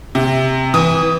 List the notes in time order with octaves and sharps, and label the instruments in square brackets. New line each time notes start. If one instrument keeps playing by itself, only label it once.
[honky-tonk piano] C3
[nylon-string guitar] E3 [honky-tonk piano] D#6